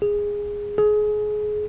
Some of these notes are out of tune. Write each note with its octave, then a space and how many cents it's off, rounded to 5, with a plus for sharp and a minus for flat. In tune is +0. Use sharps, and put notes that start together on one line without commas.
G#4 -10
G#4 +25